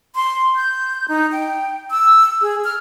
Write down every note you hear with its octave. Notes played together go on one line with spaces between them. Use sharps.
C6
G6
D#4
G5
E6
G#4
F6